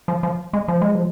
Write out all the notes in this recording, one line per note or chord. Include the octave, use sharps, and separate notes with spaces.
F3
F3
G#3
F3
G#3
F3